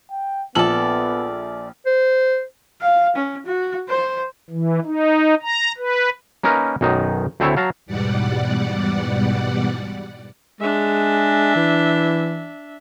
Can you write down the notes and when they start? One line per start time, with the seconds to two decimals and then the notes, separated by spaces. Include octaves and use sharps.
0.10 G5
0.55 A#1 B3 A4 D5 F#7
1.86 C5
2.81 F5
3.16 C#4
3.46 F#4
3.89 C5
4.50 E3
4.85 D#4
5.42 A#5
5.77 B4
6.43 A#3 C#4 D#4 A#4 B4
6.81 B1 F#2 D#3 D#4
7.40 D2 A3 C4 E4 C#5 E5
7.57 F#3 F5 A5 A#5
7.86 E2 G#2 B2 G3 D5 F#5
10.60 G#3 D4 E5
11.56 E3